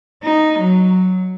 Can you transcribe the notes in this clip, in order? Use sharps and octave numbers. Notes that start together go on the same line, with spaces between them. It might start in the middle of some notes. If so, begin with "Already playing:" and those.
D#4
F#3